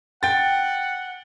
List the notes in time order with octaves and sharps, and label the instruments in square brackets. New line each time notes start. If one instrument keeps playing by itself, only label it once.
[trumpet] F#5 [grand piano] G5 A6